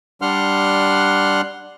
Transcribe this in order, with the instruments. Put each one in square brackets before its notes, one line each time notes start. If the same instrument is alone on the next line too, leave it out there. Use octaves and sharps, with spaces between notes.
[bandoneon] G3 D4 F#5 C6 F6 F#6